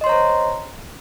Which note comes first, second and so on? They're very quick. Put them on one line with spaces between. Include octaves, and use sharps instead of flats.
D#5 C6 C#5 A#5 C5